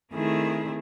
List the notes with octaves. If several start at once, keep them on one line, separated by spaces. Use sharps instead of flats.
D#3 A3 C4 E4 G#4